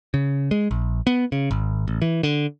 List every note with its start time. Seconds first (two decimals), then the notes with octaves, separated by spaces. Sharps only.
0.14 C#3
0.51 G#3
0.71 A#1
1.07 B3
1.32 C#3
1.51 G#1
1.88 A1
2.02 E3
2.23 D3